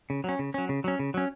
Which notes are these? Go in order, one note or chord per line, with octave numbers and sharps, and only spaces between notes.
C#3
F#3 C#4
C#3
F#3 C#4
C#3
F#3 C#4
C#3
F#3 C#4